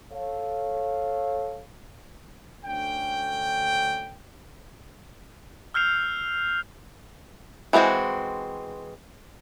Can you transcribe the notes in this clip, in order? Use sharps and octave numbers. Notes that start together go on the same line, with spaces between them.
A4 C#5 F5
D2 D3 C#4 G5
E6 F6 G6 C7 F7
E3 G#3 B3 C4 F#4